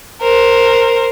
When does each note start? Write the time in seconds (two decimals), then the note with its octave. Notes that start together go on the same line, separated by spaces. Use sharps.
0.21 A#4 C5